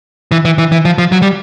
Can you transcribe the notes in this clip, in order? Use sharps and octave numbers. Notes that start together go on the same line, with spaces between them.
E3
E3
E3
E3
F3
F3
F#3
G3